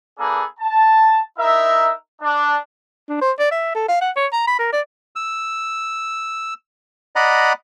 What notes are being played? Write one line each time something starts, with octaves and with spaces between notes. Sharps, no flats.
A#3 D4 G#4 A4 B4
A5
D#4 E4 A#4 E5
D4
D4
C5
D5
E5
A4
F5
F#5
C#5
A#5
B5
A#4
D5
E6
D5 D#5 F#5 A#5 B5